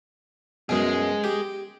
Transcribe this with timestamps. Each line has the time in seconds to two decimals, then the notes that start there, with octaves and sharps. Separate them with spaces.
0.69 F#2 B2 G#4 D#5
1.24 G4